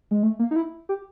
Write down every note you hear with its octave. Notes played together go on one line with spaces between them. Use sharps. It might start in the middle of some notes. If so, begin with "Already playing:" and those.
G#3
A3
A#3
D#4
E4
G4